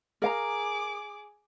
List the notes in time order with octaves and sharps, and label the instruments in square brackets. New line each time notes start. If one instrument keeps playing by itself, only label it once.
[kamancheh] G#4 D6 [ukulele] A#4 F5 A#5